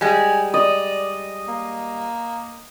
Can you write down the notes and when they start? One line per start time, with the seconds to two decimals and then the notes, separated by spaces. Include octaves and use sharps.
0.01 G3 G#3 G#5
0.54 D5 D#5
1.48 A#3